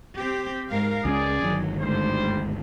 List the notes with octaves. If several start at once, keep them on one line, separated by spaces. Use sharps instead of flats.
C4 G4
G#2 A#4 F5
C#2 F#3 G#3 C#4 G#4 D5
G1 D#3 F#3
D2 G#2 G3 C5